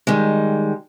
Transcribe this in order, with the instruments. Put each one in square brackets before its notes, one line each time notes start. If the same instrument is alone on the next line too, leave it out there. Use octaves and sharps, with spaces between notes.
[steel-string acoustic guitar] D#3 G3 G#3